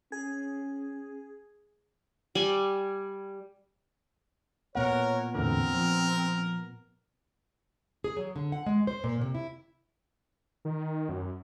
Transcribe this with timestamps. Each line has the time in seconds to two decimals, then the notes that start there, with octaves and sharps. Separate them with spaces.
0.12 C#4 G#4
2.35 G3 G#5
4.75 A#2 B3 A#4 C#5 F#5
5.35 E2 A2 D3 C4 A#4
5.74 F3
8.04 G#4
8.16 F#3
8.36 D3
8.52 F#5
8.66 G#3
8.87 C5
9.04 A#2
9.22 C3
9.35 E4
10.65 D#3
11.09 F#2